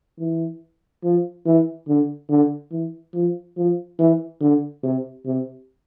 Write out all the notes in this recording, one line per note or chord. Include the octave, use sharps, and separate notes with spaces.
E3
F3
E3
D3
D3
E3
F3
F3
E3
D3
C3
C3